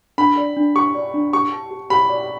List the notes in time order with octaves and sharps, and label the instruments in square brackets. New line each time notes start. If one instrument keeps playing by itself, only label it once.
[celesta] D4 [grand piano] B5
[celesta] D5
D4
[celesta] G4 [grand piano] C#6
[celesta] D5
D4
[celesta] G4 [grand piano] C#6
[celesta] A5
G4
[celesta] G4 [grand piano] B5
[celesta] D5